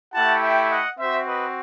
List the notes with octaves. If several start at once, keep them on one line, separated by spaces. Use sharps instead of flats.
A3 E4 G4 F#5 A5
E5 G5
D#5 F#5
C4 F#4 C5 E5
B4 D#5